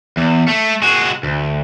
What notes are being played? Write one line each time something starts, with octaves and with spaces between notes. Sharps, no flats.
E2
A3
G#3 F#4
D2